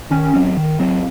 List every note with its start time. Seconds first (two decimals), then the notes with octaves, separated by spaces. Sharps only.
0.11 D#3 C#4
0.34 F#3 C4
0.57 D#3
0.80 F#3 C4